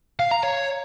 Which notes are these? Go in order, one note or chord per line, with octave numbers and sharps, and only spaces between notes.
F5
A#5
C#5